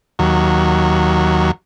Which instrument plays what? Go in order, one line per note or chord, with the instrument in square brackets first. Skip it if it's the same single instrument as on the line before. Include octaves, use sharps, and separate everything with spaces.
[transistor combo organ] D#2 F#3